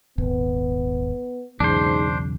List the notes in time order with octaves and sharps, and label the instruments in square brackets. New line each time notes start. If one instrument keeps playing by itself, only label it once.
[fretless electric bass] D#1 G#1 [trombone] B3
[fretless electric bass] B1 E2 C#3 [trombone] G#2 [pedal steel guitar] D4 C5